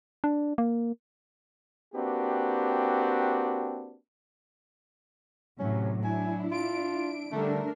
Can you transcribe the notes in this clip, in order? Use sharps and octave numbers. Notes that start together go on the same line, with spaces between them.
D4
A#3
A#3 C4 D4 F#4 G4 B4
A2 C3 E3 F#3 C#4
D4 E4 G#5
F4 D7
D3 G3 A3 D4 A#4